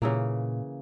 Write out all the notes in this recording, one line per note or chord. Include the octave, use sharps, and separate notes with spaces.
A#2 C#3 E3 A#3